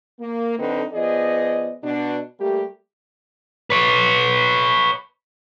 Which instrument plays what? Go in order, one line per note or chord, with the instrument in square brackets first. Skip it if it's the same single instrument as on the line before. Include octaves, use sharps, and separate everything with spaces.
[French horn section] A#3
F#2 D3 C4 D#4 A4 B4
F3 B3 G#4 D5 D#5
B2 D4
G3 A3 A#3 G4
[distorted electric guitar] B4 C#5